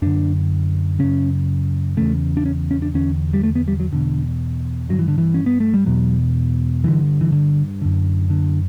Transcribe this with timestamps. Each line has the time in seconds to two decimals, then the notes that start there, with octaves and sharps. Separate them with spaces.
0.02 F#2 D3 D4
0.99 F#2 C#3 C#4
1.97 E2 C#3 A3
2.37 D4
2.46 C#4
2.71 C#4
2.82 D4
2.94 E2 D3 C#4
3.33 G3
3.43 A3
3.55 B3
3.68 G3
3.80 F#3
3.92 E2 B2 D3
4.89 G2 D3 F#3
4.99 E3
5.08 D3
5.18 E3
5.34 C#4
5.46 B3
5.60 A3
5.74 G3
5.86 E2 B2 F#3
6.84 G2 D3 E3
7.21 E3
7.32 D3
7.82 F#2 D3
8.30 D3